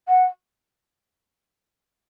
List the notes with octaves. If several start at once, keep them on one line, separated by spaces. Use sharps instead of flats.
F#5